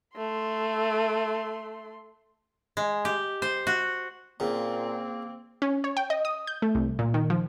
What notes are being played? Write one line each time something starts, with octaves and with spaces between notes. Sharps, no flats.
A3 C6
G#3
G4
C5
F#4
A#2 C#3 A#3 C4
C#4
C#5
G5
D#5
D#6
G6
A3
C2
A#2
D#3
F3